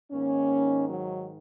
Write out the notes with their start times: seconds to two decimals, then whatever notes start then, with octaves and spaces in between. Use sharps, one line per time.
0.12 G#2 D#3 A#3 C#4
0.90 F#3